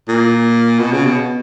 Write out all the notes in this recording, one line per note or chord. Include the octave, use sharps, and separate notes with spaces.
A#2
B2
C#3
B2